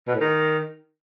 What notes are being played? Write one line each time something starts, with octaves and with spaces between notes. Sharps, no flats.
B2
A2
D#3